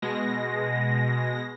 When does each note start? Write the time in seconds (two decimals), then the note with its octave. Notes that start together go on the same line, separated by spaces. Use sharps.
0.02 B2 G#3 A#6